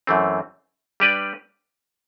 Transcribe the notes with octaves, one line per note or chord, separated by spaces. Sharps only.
F#2 E3 A3 C4
G3 D4 G4 B4 D5